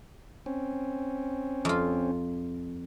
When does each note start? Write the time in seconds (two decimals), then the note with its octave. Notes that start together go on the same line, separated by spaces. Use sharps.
0.46 C4 C#4
1.65 F2 F4